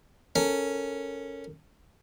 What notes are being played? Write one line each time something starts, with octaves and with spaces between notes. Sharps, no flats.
C#4 A4 A#4